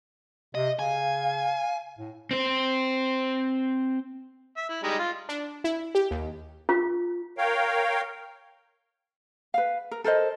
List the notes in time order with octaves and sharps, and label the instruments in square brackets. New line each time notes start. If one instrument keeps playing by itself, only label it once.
[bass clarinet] C3 [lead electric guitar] D#5
[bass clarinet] C#3 [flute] F5 [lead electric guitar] G#5
[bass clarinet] A2
[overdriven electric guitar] C4 C5
[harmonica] E5
E4
G3 G#3 D#4
F4
[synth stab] D4
E4
G4
D#2
[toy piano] F4
[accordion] A#4 C#5 F5 G5
[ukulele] B4 F5
A#4
A4 A#4 C5 D#5